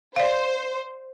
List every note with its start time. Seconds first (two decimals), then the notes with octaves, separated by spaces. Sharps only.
0.16 C5 D5 F5